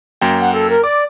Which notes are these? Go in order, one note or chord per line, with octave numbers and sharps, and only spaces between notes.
F#2 A#3 G5
F#5
A4
A#4
D5 D6